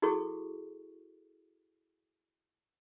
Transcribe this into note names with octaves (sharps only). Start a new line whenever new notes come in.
E4 F#4 G#4 A4 C#6